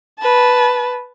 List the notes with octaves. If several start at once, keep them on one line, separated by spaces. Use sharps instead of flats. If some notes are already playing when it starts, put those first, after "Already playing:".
B4 A5